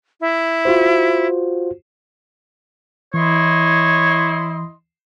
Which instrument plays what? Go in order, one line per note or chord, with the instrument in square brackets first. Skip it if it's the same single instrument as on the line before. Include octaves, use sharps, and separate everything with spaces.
[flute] E4
[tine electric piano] F4 F#4 C5
[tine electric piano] E3 [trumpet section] E4 D#5 C6 [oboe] C#5